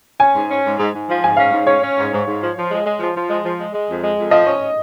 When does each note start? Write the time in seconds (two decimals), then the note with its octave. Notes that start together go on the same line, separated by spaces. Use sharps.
0.19 C#4 G#5
0.34 G#2
0.49 C#4
0.64 G#2
0.78 G#2
0.93 G#2
1.08 F3
1.23 G#2 G#5
1.36 C#4 F5
1.51 G#2
1.66 C#4 C#5
1.82 C#4
1.96 G#2
2.11 G#2
2.25 G#2
2.40 F3
2.55 F3
2.70 G#3
2.84 G#3
2.99 F3
3.14 F3
3.28 G#3
3.43 F3
3.58 G#3
3.72 G#3
3.88 F2
4.02 G#3
4.17 F2
4.31 F3 D#5
4.46 C#4